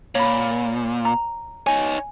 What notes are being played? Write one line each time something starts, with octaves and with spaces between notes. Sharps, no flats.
A#2 C#5 B5
A#5
D#4 C#5 G#5